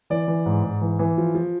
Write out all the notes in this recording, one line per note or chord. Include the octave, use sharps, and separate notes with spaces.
E3 D5
E3
G#2
G#2
E3
E3
F3
F3